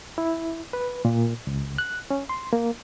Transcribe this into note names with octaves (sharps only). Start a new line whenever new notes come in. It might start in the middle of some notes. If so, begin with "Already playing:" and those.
E4
B4
A#2
C#2
F#6
C#4
C6
A#3